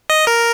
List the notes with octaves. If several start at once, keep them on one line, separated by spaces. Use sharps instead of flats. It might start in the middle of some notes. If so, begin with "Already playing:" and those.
D#5
A#4